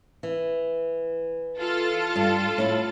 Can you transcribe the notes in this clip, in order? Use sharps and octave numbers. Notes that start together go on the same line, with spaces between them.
E3
F4 A4 A6
G2
A2 E4